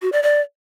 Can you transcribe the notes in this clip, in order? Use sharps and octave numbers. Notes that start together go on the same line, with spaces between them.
F#4
D5
D5